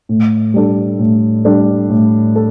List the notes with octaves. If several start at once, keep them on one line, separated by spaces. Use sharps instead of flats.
A2
G3 D4 A4
A2
G3 D4 A4
A2
A4